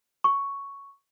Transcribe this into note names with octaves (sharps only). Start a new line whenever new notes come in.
C#6